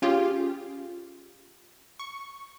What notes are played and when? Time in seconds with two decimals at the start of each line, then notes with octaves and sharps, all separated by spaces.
0.02 C#4 F4 G4 G#4
1.99 C#6